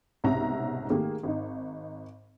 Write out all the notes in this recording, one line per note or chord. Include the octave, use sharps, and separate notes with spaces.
C2 G#2 B2 C#4 E5 A#5
D#3 A3 A#3 G4 G#4
G#1 D#4